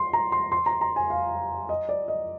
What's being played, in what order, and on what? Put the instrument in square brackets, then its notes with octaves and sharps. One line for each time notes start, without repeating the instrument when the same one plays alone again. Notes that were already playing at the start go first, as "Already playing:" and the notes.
Already playing: [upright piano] C6
A#5
C6
C6
A#5
A#5
G#5
F5
D#5
D5
D#5